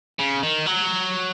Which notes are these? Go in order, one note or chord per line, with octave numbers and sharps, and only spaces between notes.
C#3
D#3
F#3